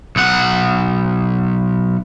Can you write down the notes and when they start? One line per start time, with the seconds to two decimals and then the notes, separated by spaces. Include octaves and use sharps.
0.16 B1 F#5